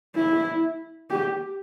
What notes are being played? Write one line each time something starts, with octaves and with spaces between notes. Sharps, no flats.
E4
G4